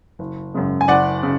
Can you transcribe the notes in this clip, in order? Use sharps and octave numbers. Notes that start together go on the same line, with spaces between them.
F#1
F#2 C#3 G#3
G#5
F#1 D5 F#5
C#3